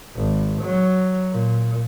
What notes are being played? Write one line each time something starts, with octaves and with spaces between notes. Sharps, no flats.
G#1
F#3
A#2